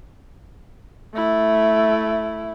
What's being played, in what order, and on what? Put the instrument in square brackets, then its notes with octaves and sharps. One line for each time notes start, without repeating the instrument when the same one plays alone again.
[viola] A3 E4